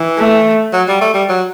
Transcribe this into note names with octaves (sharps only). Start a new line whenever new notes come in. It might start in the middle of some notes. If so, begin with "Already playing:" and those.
Already playing: E3
A3
F#3
G3
A3
G3
F#3